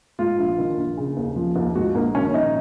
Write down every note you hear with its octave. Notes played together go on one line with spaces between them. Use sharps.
G#2 F4
A#1
D#3
A#1
C#3
D#2
F3
D#2
G#2 F#4
A#1 A#3
D#3 C#4
A#1 D#4